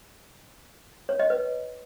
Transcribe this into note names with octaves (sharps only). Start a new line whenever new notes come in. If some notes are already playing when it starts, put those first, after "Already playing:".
C#5
D#5
B4